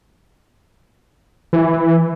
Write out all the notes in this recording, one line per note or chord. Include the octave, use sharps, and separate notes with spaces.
E3